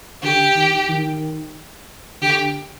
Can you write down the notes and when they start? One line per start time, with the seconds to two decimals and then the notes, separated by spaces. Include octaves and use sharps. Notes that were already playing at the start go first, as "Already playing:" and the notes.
0.23 D3 G4
0.56 D#3
0.89 D#3
2.22 D3 G4